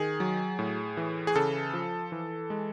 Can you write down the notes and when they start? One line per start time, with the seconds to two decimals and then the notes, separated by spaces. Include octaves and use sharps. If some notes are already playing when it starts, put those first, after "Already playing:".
Already playing: D#3 G#4
0.20 F#3
0.59 A2
0.97 E3
1.27 G#4
1.35 C#3 A4
1.73 F3
2.12 E3
2.50 G#3